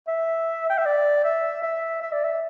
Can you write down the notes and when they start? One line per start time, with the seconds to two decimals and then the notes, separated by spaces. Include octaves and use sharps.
0.08 E5
0.70 G5
0.78 E5
0.86 D5
1.24 E5
1.63 E5
2.02 E5
2.12 D5
2.24 E5